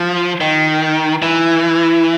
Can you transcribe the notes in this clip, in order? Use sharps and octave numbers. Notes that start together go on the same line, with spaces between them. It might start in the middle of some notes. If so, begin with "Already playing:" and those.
Already playing: F3
D#3
E3